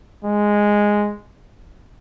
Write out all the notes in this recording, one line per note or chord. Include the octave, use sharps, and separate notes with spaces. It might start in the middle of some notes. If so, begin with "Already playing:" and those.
G#3